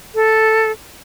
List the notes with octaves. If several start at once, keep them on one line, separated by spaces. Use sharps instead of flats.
A4